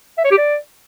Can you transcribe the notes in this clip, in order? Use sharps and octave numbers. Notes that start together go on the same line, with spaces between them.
E5
C#5
G4
D5